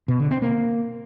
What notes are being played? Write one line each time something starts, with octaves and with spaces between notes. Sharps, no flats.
B2
D3
C4
A#3